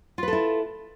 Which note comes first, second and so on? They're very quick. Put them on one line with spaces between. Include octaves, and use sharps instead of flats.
F4 B4 A4 E4